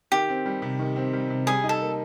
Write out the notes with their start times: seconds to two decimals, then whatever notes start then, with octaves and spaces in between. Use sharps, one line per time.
0.12 D#3 G4
0.29 C4
0.46 G3
0.62 C3
0.79 D#3
0.96 C4
1.13 G3
1.30 C3
1.47 G3 G#4
1.64 D#4
1.69 A4
1.81 A#3